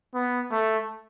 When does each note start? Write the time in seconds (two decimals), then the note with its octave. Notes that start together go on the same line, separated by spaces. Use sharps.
0.14 B3
0.51 A3